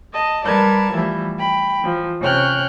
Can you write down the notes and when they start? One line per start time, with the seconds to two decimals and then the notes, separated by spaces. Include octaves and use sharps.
0.13 D#5 A5
0.45 G3 A#4 B4 D5 A5 G#6
0.93 E3 F3 G3 A3 E4
1.39 G5 B5
1.80 E3 F3
2.21 C3 C#4 C#5 G5 F6 F#6